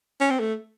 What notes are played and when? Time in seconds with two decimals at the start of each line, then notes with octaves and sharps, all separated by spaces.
0.20 C#4
0.30 C4
0.40 A3